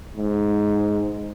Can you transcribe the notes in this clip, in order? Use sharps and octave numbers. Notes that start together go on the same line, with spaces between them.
G#2